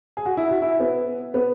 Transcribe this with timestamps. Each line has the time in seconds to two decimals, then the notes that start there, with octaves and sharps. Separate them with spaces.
0.17 G#4
0.25 F#4
0.37 E4
0.49 F#4
0.62 E4
0.80 B3
1.34 B3